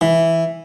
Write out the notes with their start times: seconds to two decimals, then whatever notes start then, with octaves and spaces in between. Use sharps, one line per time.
0.01 E3